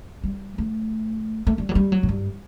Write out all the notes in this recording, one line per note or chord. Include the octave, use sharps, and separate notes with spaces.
G3
A3
A3
G3
F#3
G3
F#3
A2
G2